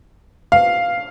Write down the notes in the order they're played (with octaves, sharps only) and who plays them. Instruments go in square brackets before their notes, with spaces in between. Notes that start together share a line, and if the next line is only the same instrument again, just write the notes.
[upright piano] F5